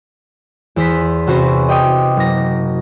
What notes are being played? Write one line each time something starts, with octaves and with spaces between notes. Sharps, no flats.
E2 C5 B6
C3 C#4 F#4 B4 C5
D#5 G5 D6 D#6
F#1 A#6